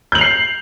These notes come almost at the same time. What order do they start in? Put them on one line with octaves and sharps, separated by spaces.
G6 F#7 F7 C7